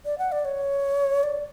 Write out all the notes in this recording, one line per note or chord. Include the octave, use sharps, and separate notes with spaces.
D5
F#5
D5
C#5
D5